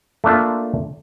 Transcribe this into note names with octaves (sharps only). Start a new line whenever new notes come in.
A3 A#3 D4 F4